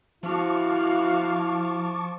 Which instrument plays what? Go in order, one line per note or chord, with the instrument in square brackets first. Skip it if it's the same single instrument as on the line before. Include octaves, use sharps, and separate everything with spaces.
[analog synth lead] F3 [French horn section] E4 [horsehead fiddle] F#4 F5 [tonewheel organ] A5 C#6 D6